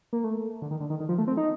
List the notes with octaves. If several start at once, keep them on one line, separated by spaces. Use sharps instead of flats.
A#3
A3
D3
D#3
D3
D#3
D#3
F3
A3
C4
D#4